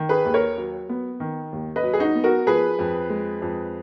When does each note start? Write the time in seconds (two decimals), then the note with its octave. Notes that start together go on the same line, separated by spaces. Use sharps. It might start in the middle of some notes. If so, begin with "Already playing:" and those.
Already playing: D#3
0.09 G#4 B4
0.25 D#2
0.34 A#4 C#5
0.58 F#3
0.89 B3
1.20 D#3
1.52 D#2
1.76 B4 D#5
1.83 F#3
1.93 G#4
1.99 D#4 F#4
2.15 B3
2.24 F#4 A#4
2.47 F3 G#4 B4
2.79 F2
3.10 G#3
3.42 F2